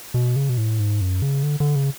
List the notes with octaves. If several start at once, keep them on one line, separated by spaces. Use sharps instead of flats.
B2
C#3
B2
A2
G#2
F#2
C#3
D3
D3
C#3